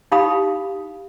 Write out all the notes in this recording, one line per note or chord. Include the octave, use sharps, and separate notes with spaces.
D#4 E4 G4 F5 B5 D#6